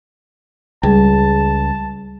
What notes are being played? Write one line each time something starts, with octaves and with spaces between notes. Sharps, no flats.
C#2 G3 G#4 A5